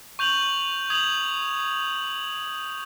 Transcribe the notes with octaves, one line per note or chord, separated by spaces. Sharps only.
C#6 G6 F7 F#7
D#6 G#6 F7 F#7